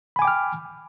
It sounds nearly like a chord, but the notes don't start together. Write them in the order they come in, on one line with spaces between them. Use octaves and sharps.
B5 G#5 D6 G5 F6